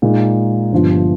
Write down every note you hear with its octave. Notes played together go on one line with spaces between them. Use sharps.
A#2 G#3 D#4
G1 G2 F3